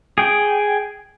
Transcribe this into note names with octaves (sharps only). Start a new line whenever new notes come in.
G#4 G5